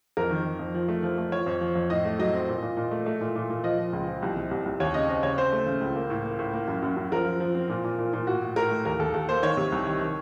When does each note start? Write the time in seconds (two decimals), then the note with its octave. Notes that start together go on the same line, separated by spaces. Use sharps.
0.17 F2 A#4
0.31 D#3
0.46 D#3
0.59 F2
0.74 F3
0.88 A3
1.03 F3
1.18 A3
1.32 F3 C#5
1.46 F2
1.61 F3
1.75 F2
1.90 A2 D#5
2.05 A3
2.19 F#3 D#5
2.33 C4
2.48 A#2
2.62 A#2
2.77 A#2
2.91 A3
3.06 A3
3.21 A#2
3.35 A#2
3.50 A#2
3.64 F3 D#5
3.78 F3
3.93 C#2
4.07 F3
4.22 C2
4.36 C3
4.51 C2
4.65 C2
4.80 D#2 C#5
4.94 C#3 D#5
5.09 C4 D#5
5.23 C#3 C#5
5.38 C4 C5
5.52 A3
5.66 C#3
5.81 C#2
5.96 A#3
6.10 A2
6.25 A#3
6.39 A2
6.54 A#3
6.68 F#2
6.82 F#2
6.97 F#2
7.12 F3 A#4
7.26 F3
7.40 F3
7.55 C4
7.69 A#2
7.84 A#2
7.99 A#2
8.13 A#2
8.27 A2 F#4
8.42 A2
8.56 A2 A#4
8.71 A3
8.85 D#2 A#4
8.99 D#2 A4
9.14 D#2 A4
9.29 A#3 C5
9.43 D#3 C#5
9.57 C3
9.72 C2
9.87 D#3
10.01 D#3